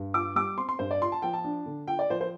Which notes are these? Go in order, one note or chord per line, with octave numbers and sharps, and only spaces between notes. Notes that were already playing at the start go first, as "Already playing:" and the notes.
Already playing: G2
F4 D6
G3 D6
C4 C6
C6
G2 C5
D5
F4 C6
A5
F3 G5
A5
D4
D3
F4 G5
D5
F3 C5
C5